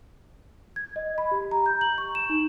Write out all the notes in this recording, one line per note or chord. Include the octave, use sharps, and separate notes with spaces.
G#6
D#5
B5
G4
A#5
G6
F#7
C#6
E7
D#4